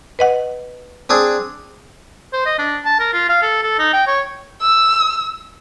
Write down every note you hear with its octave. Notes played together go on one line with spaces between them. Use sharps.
B4 D#5 F#5
C4 D4 G#4
C5
D#5
D4
A5
A#4
F4
F5
A4
A4
D#4
G5
C#5
E6